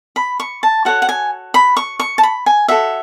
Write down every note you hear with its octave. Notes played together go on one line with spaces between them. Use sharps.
B5
C#6
A5
F#4 A4 C#5 F#5
F#5
G#5
B5
C#6
C#6
A5
B5
G#5
F#4 A4 C#5 E5